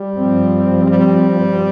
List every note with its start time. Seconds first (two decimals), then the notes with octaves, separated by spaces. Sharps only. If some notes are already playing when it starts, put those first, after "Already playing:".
Already playing: G3
0.13 G2 F3 C4
0.87 G3